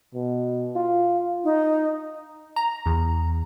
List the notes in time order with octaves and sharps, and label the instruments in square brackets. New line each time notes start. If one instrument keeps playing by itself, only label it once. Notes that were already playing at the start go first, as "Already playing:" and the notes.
[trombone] B2
F4
[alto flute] D#4
[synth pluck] A#5
E2